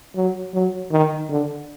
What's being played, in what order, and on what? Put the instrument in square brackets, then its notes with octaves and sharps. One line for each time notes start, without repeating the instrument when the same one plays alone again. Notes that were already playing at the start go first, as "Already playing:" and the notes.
[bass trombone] F#3
F#3
D#3
D3